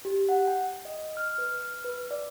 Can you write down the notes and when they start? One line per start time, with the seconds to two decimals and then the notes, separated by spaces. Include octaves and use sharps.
0.05 G4
0.29 F#5
0.47 G5
0.85 D#5
1.17 F6
1.38 B4
1.61 F6
1.85 B4
2.11 D5